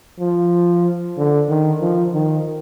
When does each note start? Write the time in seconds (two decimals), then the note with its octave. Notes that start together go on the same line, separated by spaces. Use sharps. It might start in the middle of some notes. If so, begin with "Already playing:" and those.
0.20 F3
1.17 D3
1.49 D#3
1.82 F3
2.14 D#3